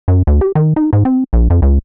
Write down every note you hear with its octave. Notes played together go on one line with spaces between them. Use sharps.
F#2
D2
G4
D#3
D#4
G#2
C4
A#1
F2
C#2